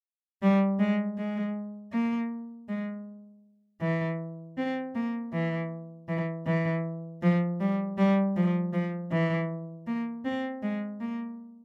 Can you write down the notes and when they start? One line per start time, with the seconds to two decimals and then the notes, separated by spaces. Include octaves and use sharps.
0.42 G3
0.79 G#3
1.18 G#3
1.93 A#3
2.69 G#3
3.82 E3
4.58 C4
4.95 A#3
5.33 E3
6.08 E3
6.46 E3
7.22 F3
7.60 G3
7.98 G3
8.36 F3
8.73 F3
9.12 E3
9.87 A#3
10.25 C4
10.62 G#3
11.01 A#3